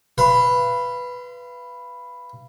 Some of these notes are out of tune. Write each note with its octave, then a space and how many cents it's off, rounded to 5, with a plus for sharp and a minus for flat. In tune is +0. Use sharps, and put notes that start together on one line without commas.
B4 +0 F5 -35 C6 -30